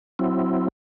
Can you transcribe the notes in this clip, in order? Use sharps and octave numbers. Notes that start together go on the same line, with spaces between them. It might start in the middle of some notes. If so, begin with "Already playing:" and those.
F#3 C4 E4